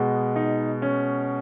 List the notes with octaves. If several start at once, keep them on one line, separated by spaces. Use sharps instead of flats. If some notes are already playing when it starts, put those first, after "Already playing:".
Already playing: B2 G#3 B3
D#4
C#4